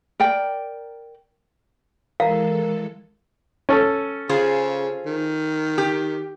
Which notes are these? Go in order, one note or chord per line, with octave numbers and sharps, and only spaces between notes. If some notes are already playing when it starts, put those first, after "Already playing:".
A#4 D5 G5
E3 G#3 A4 A#4 F5 A#5
C#4 A4
C#3 F4 G#4 C5
D#3
G4